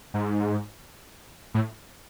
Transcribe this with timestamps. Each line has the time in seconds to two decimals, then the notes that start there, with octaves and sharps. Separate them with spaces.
0.14 G#2
1.54 A2